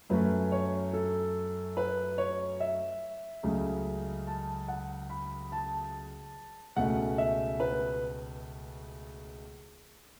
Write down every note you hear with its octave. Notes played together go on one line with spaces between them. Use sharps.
F#2 F#3 A3 C#4 B4
C#5
A4
B4
C#5
E5
C#2 C#3 F#3 A3
A5
F#5
B5
A5
C#2 B2 A3 C#4 F#5
E5
B4